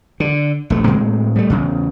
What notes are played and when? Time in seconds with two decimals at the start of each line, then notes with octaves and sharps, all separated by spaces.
0.20 D3
0.70 A#1 A3
0.84 A2 G#3 C4
1.36 G3 A3
1.50 E2 C#3